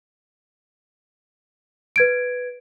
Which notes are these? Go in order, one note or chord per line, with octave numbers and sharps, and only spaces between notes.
B4 G#6 D7